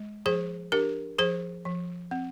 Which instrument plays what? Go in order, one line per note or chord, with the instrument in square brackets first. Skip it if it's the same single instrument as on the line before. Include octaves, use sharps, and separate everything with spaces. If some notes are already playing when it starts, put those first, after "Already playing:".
Already playing: [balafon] G#3
F3 G#4 C5
D4 G4 A#4
F3 G#4 C5
F3
C4